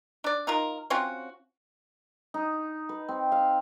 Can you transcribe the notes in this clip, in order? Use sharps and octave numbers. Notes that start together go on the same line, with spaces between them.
D4 D5
D#4 F4 A#4
C4 C#4 F4 F#4
D#4
B4
C4
F5